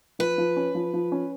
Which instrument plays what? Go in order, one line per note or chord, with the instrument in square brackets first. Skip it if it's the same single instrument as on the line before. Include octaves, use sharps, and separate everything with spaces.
[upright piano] F3 [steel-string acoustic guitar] B4
[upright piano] F3
C#4
F3
F3
C#4